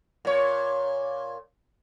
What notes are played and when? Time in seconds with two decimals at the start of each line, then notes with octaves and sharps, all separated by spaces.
0.25 A#2 C#5